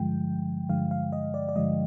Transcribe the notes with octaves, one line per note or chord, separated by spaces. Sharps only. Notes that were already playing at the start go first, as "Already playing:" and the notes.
Already playing: G2 D3 F3 G#3 G5
G2 D3 F3 G#3 F5
F5
D#5
D5
D5
G2 D3 F3 G#3 D#5